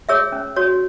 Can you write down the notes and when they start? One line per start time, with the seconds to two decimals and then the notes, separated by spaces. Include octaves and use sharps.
0.09 G#4 C#5 E5 E6
0.32 C#4
0.56 F#4 C#5